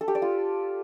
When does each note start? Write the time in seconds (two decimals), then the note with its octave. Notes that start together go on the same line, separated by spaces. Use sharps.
0.01 A4
0.08 G4
0.15 D5
0.22 F4